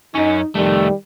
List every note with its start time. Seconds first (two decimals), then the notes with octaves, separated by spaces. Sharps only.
0.15 F#2 C#4 D#4
0.55 F2 D#3 G3 A3